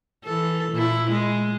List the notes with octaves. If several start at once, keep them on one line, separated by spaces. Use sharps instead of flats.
E3 A4
A#2 E4
G#3